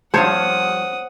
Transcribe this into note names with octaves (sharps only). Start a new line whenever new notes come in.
G2 F3 C5 C#5 F#5 A5 D#6